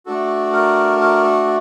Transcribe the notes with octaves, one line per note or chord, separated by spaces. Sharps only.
A3 D4 F#4 A4
A#4
A#4
A4